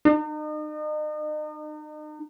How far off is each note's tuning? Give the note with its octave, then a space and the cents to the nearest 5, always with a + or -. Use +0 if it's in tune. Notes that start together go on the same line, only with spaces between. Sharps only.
D#4 -40